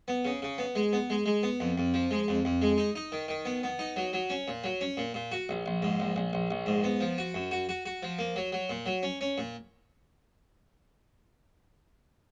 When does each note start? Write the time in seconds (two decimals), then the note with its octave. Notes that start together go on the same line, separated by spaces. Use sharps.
0.08 B3
0.25 C#3
0.42 C#3
0.58 B3
0.75 G#3
0.93 B3
1.10 G#3
1.26 G#3
1.43 B3
1.60 F2
1.78 F2
1.94 F3
2.11 G#3
2.28 F2
2.45 F2
2.62 G#3
2.78 D#4
2.95 D#4
3.12 D#3
3.28 D#3
3.45 B3
3.63 B3
3.79 D#4
3.96 F#3
4.13 F#3
4.30 C#4
4.48 A#2
4.64 F#3
4.81 C#4
4.97 A#2
5.14 A#2
5.32 F#4
5.49 A#1
5.66 A#1
5.82 G#2
6.00 A#1
6.16 A#1
6.33 A#1
6.51 A#1
6.66 G#2
6.84 B3
7.01 F3
7.18 F#4
7.34 F#2
7.51 F#4
7.69 F#4
7.86 F#4
8.03 F3
8.19 A#3
8.36 F#3
8.52 F#3
8.70 A#2
8.86 F#3
9.03 C#4
9.21 C#4
9.38 A#2